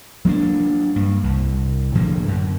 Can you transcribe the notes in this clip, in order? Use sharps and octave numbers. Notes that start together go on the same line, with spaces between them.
F#3 A#3 B3 D4
G2
C2
A2 D3 F3 A#3
F#2